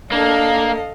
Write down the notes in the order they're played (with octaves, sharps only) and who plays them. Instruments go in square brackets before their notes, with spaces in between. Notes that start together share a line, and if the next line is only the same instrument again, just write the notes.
[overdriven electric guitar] A#3 [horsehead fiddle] D4 [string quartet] A4 D#5 F5